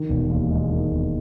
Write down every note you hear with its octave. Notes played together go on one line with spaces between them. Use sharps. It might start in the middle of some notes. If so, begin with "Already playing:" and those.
Already playing: D#3
E1
D#2
G#3
D#3
E1